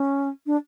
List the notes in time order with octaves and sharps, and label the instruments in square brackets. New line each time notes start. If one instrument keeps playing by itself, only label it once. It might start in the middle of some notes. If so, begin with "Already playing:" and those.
Already playing: [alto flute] C#4
D4